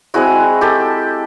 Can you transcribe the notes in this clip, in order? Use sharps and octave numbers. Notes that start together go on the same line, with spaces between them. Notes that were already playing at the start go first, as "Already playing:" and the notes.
G#3 C4 E4 F#4 G#4
G4 A4